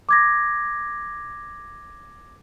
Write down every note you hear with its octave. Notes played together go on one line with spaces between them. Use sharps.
D6 G#6 A#6